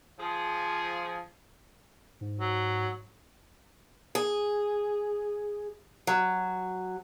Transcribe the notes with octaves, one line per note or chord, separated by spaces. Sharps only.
F3 G#4
G#2
F#3
G#4
F#3